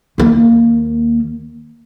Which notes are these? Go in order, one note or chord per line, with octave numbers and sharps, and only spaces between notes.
D#2 A#3